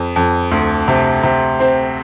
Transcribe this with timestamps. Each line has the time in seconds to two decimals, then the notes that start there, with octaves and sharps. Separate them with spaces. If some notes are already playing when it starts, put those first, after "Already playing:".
Already playing: F2
0.16 F2
0.51 D2
0.88 C3
1.23 C3
1.60 C4